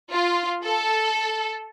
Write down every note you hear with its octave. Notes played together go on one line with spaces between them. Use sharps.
F4
A4